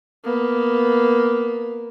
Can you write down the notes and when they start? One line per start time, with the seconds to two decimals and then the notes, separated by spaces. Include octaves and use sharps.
0.24 A#3 B3